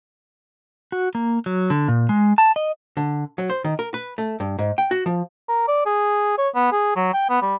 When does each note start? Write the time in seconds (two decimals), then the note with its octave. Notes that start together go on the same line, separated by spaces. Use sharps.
0.92 F#4
1.15 A#3
1.46 F#3
1.70 D3
1.88 A#2
2.09 G#3
2.38 A5
2.56 D#5
2.97 D3
3.38 F#3
3.50 C5
3.64 D#3
3.79 A#4
3.94 B4
4.18 A3
4.40 G2
4.59 G#2
4.78 G5
4.91 F#4
5.06 F3
5.49 A#4
5.68 D5
5.86 G#4
6.38 C#5
6.55 B3
6.72 G#4
6.96 F#3
7.13 G5
7.30 B3
7.42 G3